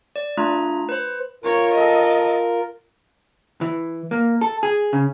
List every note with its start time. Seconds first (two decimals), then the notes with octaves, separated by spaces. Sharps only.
0.16 D5
0.37 A3 D4 F4 A#5
0.89 B4 C5
1.44 F4 A#4 C#5
1.74 A4 D#5
3.61 E3
4.11 A#3
4.41 A4
4.63 G#4
4.93 C#3